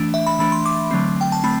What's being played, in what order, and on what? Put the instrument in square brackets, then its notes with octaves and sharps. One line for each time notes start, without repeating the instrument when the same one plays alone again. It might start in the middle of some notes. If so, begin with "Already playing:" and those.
Already playing: [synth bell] E3 A3 D4
E5
B5
E3 A3 D4 B5
C6
D6
D3 F#3 A3 C4
G5
A5
A3 C4 B5